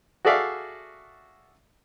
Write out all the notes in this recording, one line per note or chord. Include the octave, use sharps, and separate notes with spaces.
F#4 G#4 A4 D5 E5 F5